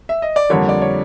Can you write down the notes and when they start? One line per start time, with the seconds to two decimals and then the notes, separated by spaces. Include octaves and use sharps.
0.09 E5
0.22 D#5
0.36 D5
0.49 F2 D3 G3 A#3 C#5
0.69 D5
0.82 C#5